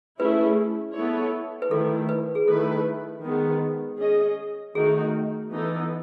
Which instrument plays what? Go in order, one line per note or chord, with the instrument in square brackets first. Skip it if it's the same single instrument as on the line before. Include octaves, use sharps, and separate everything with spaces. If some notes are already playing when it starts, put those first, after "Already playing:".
[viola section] A3 C#4 E4 G#4 [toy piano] B4
[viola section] B3 E4 A4 C#5
[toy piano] B4
[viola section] D#3 A3 E4 [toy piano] A4
[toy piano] B4
G#4
[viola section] D#3 A3 E4 B4 [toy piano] A4
[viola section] D#3 G#3 B3
C#4 G#4 D#5
[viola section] D#3 A3 D#4 F#4 [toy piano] G#4
[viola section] E3 B3 D#4 A4